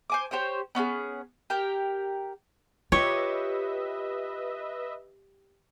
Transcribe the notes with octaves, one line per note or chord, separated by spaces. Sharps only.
C5 G#5 D6
G4 C5 C#5 G5
B3 C#4 E4 G#4
G4 A#4 G5
F4 G4 B4 C#5 D#5 E5